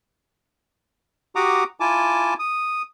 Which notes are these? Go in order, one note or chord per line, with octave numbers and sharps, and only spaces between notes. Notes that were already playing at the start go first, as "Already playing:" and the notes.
F#4 G4 F#5 A#5 D6 D#6
E4 F4 G#5 A5 D6
D#6